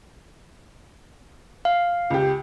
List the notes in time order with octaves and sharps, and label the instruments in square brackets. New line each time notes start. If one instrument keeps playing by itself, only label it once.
[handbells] F5
[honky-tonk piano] C#2 G4